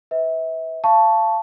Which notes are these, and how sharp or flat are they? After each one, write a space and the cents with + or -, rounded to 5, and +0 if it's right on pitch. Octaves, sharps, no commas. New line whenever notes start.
B4 +15 E5 -30
F5 -30 A5 +0 C#6 +0